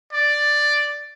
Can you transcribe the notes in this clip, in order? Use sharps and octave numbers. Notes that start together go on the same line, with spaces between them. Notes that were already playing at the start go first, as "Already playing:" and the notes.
D5